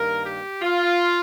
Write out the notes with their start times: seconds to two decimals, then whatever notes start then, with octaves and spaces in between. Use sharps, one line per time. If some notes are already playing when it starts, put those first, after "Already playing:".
Already playing: G2 D#3 A#3 A#4
0.24 G4
0.62 F4